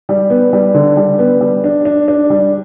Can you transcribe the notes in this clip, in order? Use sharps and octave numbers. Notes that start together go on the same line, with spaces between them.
G3
B3
G3
D3
G3
B3
G3
D4
D4
D4
G3